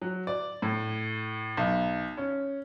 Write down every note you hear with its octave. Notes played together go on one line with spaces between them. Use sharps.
F#3
D5
A2
B1
C#4